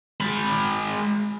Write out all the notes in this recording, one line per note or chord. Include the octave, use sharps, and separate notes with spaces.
G#3 B5